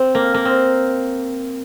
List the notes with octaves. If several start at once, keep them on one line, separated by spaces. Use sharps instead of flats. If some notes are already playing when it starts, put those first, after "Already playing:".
Already playing: C4
A#3
A#3
C4